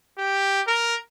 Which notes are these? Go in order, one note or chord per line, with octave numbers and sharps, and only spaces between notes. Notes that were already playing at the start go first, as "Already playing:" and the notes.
G4
A#4